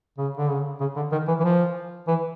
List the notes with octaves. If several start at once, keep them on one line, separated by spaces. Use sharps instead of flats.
C#3
D3
C#3
C#3
D3
D#3
E3
E3
F3
E3